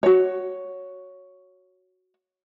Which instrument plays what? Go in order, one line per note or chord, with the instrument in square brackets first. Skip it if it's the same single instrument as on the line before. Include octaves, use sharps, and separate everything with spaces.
[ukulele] F#4 C#5